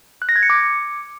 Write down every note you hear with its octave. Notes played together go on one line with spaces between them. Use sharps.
F#6
A#6
G#6
C#7
D6